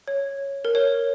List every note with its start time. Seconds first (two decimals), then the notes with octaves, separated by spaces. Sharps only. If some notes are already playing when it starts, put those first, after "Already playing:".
0.08 C#5
0.65 A#4
0.75 C#5